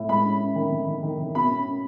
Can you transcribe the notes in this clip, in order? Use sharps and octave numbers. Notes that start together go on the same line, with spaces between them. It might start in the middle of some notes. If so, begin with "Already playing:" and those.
Already playing: A2
G#3 B5
C#4
C#4
D#3
D#3
D#3
D#3
D#3
B2 B5
C#4
C#4